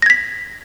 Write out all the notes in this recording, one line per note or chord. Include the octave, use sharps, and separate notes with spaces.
G#6 A#6 B6